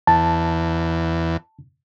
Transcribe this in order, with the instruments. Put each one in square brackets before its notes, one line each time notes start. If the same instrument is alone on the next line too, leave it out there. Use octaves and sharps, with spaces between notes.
[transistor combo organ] E2 [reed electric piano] A5